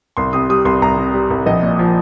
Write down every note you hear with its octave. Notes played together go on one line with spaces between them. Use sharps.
C2 C6
C3 D#6
G3 D#6
C2 C6
C2 A#5
C3
G3
C2
A#1 D#5
A#2
F3